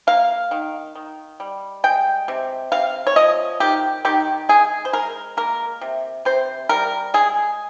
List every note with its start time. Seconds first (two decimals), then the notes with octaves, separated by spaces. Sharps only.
0.07 A#3 F5
0.51 D#3
0.95 D#3
1.40 G3
1.84 G#3 G5
2.28 C3
2.72 C3 F5
3.07 C#5
3.16 F3 D#5
3.60 D#3 G4
4.05 D#3 G4
4.49 G#3 G#4
4.85 C5
4.93 G#3 A#4
5.37 A#3 A#4
5.81 C3
6.25 C3 C5
6.69 G3 A#4
7.14 G#3 G#4